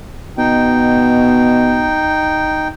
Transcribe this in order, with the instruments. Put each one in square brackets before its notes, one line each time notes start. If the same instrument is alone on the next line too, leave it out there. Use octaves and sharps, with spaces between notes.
[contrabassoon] B2 [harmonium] D#4 G5